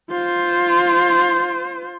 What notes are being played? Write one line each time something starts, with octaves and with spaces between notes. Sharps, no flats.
F4 C5